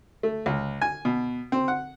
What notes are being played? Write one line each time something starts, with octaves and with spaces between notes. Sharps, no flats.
A3
C#2
G#5
B2
C4
F#5